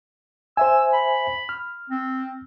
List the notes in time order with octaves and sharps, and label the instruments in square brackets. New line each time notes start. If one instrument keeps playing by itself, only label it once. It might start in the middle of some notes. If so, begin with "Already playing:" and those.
[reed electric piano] C5 E5 G#5 [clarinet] E6
[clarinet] B5
[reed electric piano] F6
[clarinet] C4